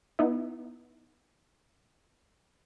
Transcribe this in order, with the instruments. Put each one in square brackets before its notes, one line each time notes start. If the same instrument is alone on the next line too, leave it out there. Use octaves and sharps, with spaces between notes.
[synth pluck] B3 D#4 E4